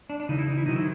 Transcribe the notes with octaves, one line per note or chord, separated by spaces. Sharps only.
D4
D4
C#3 E3 D#4
E4
D#4
E4
C3 D#3 F#3 D#4
E4